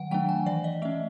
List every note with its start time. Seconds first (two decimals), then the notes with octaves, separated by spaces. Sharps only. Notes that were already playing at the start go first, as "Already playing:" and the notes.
Already playing: D#3 F#3 F#5
0.11 F#3 A3 D4 G5
0.29 G#5
0.46 E3 D5
0.64 D#5
0.82 A3 C#4 E5